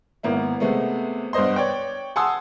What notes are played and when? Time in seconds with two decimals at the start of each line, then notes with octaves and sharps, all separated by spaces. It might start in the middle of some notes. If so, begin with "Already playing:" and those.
0.23 G#1 A#3 B3 E4
0.60 C3 G#3 A3 B3
1.33 G2 B3 C5 D#5 C6
1.56 C#5 D5 G5
2.16 F#5 G#5 A5 C6 D#6 E6